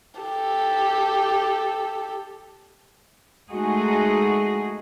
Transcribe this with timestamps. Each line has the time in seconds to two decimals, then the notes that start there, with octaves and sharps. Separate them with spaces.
0.20 G4 A4
3.50 G#3 A3 D#4 F#4 G#4